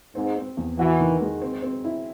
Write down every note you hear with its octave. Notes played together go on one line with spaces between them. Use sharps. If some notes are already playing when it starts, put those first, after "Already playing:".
G#2 C4
C4
E2
E3 F#4
D#3
G#3
C4
C4
E4